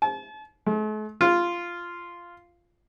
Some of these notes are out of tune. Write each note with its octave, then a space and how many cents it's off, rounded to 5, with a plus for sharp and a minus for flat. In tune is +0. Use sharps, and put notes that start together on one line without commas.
A5 -40
A3 -45
F4 -10